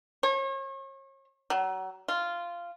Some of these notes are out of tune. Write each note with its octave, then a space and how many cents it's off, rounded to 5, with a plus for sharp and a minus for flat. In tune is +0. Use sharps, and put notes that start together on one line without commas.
C#5 -40
F#3 +30
F4 -10